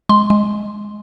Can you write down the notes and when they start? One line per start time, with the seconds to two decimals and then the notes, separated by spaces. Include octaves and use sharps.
0.09 G#3 C6
0.30 G#3